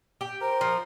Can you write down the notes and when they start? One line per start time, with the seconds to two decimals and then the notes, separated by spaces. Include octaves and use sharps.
0.21 G4
0.41 A#4 C5
0.61 F3